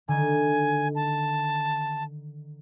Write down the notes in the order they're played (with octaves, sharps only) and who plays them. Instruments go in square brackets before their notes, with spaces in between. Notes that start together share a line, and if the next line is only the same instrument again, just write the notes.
[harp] D3 D#3 [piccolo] G#5
[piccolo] A5